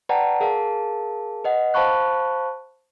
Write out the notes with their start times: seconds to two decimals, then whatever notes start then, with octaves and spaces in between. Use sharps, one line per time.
0.09 B4 D5 F#5 G5 A5 A#5
0.41 G#4 A#4 F5 A5
1.45 B4 D#5 F#5
1.74 C5 F5 A5 B5 C#6 F#6